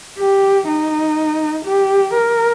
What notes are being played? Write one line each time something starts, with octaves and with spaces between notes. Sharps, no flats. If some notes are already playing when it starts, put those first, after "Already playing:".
G4
D#4
G4
A#4